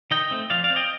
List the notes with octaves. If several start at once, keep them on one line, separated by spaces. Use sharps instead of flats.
D#3 D#5 G5
A3 C4
F3 D5 F5
D5 F5
C4
D#5 G5